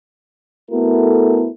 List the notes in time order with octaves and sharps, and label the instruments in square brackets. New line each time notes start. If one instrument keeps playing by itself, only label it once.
[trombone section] A3 B3 E4 F#4 A4 A#4